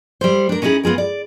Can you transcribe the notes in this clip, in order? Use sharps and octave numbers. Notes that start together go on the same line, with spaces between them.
G3 E4 C5
D4 A#4
C#4 D#4 E4 F#4 G#4
B3 F4 G#4 A#4
D5